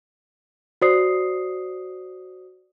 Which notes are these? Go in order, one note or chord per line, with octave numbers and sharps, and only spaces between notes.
F#4 C5 D5 D#6 C7